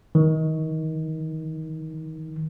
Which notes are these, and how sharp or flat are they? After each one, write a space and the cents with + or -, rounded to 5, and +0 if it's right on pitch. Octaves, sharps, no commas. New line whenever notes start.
D#3 +25